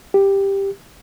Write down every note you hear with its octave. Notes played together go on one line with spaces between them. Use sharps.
G4